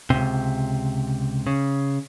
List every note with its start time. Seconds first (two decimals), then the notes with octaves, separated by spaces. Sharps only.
0.10 C#2 G#2 C3
1.47 C#3